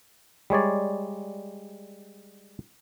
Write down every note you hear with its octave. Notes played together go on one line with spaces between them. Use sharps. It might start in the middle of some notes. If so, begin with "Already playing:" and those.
G3 G#3 C#5 D5